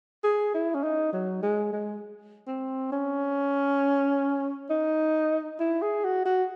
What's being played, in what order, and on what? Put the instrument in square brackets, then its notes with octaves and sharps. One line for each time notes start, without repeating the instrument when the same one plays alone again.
[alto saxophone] G#4
E4
C#4
D#4
F#3
G#3
G#3
C4
C#4
D#4
E4
G#4
F#4
F#4